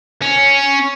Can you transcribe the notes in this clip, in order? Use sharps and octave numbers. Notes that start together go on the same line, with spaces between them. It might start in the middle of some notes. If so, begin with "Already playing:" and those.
C#4